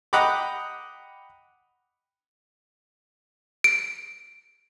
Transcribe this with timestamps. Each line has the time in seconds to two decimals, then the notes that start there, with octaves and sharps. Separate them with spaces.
0.13 D#5 F#5 G5 A#5 B5 D6
3.64 D7